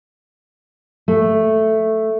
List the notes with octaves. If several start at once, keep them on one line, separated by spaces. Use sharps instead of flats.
A3